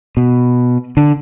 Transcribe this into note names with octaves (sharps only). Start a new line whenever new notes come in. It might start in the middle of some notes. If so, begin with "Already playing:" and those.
B2
D3